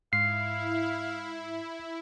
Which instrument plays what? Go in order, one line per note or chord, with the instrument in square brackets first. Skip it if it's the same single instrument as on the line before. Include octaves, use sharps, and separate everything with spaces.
[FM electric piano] G#2 [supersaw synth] E4 [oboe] F5 [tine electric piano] C7